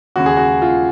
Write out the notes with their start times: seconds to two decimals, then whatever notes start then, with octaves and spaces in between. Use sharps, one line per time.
0.16 D#2 C#3 F#4
0.26 G#4
0.37 F#4
0.62 F4